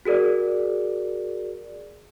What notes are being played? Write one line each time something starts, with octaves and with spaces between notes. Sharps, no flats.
F#4 G#4 A#4 D5